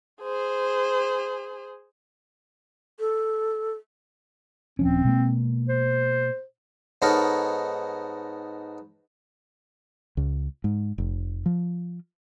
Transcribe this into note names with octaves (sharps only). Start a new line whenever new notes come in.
G#4 C5
A4
D#1 F3 C4 C#4
B2 G#3 A#3
C5
G#2 B3 D#4 A4 A#4 C#5
C#2
G#2
F1
F3